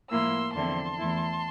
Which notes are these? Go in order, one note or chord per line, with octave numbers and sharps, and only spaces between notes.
A2 F3 A#3 E4 C6 E6
E2 D3 F3 C4 E4 A5 C6
E2 E3 A3 E4